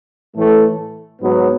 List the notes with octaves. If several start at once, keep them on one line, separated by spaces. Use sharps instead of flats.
A2 E3 A3
G#2 F#3 B3